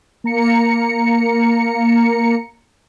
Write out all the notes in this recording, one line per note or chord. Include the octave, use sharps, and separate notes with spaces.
A#3 A#5 C#7